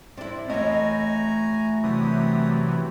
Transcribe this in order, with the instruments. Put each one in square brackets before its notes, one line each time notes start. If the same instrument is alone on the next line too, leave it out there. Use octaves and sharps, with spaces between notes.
[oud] C4 E4 [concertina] D4 D5
[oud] E2 D#5 [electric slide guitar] A3 C#5 [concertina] F#4 G#5 A#5
[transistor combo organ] C3 E3 F#3 [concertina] D4 G4 D#6